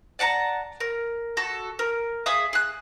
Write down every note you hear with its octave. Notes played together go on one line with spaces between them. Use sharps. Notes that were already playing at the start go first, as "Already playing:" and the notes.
D5 F#5 A5 A#5
A#4
F#4 A4
A#4
G#4 E5 F5 D#6
G#4 F#6